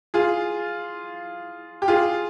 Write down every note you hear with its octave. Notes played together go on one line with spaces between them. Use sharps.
F4 G#4
G4
F4 G#4